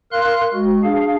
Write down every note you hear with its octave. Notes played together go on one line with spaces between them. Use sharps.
A#4 F5 C6 F#6
G#3 F#4
D4 G#4 F5